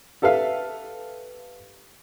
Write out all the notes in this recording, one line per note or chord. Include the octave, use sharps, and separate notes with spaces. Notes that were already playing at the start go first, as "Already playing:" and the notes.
G4 A4 B4 E5 F5